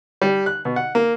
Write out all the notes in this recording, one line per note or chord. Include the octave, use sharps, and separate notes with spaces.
G3
F#6
B2
F#5
A#3